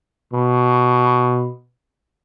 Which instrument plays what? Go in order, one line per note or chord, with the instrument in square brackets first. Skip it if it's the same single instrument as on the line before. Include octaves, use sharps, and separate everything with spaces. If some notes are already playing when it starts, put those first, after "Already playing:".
[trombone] B2